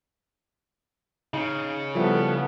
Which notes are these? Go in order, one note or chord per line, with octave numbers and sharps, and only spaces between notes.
C#3 D#4
F3 G3 B3 E4 A4